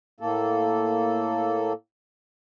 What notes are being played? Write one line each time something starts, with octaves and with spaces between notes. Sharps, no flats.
A2 A#3 A4